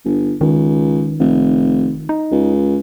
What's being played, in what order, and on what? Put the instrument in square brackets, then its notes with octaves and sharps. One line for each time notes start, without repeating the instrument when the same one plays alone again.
[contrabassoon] G1
[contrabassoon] C#2 [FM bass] D#3
[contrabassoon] F1
[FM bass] D#4
[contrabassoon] C#2